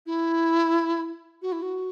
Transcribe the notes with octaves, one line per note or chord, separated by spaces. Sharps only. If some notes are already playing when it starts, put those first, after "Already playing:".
E4
F#4
E4
F#4